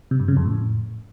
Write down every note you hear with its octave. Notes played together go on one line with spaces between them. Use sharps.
C3
G2
C#3
F2
A2